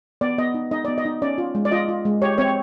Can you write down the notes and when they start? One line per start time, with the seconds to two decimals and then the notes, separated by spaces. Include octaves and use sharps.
0.21 B3 D5
0.38 B3 D#5
0.54 D#4
0.71 D#4 D#5
0.85 B3 D5
0.98 D#5
1.05 D#4
1.22 C#4 D5
1.38 F4
1.55 G#3
1.65 D5
1.72 F4 D#5
1.89 F4
2.05 G#3
2.22 G4 C#5
2.38 C4 C#5